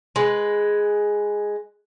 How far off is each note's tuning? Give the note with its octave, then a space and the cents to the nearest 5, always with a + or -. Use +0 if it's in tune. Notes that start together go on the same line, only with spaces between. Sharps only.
G#3 +0 B4 +0